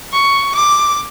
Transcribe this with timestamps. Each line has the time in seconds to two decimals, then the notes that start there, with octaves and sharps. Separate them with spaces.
0.13 C#6
0.55 D6